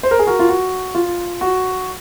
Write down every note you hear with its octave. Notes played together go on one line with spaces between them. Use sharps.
C5
A#4
G#4
F#4 A#4
F4
F#4
F4
F#4